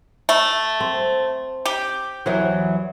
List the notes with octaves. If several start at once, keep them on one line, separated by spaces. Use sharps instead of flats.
A3
C4
G4
E2 E3 F#3